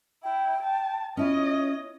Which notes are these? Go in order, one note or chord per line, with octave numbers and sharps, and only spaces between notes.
E4 G5
A5
C#4 E4 F4 C#5 D#5